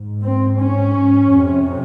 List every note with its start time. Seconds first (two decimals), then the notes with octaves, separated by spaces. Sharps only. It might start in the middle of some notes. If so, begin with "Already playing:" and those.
Already playing: G#2
0.23 C4
0.58 C#4
1.30 F2 C3